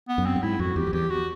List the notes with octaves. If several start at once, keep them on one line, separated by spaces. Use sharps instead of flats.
B3
F#2
C4
G2
G#2 E4
F2 F#4
E2 G4
F2
E2 G4
F#4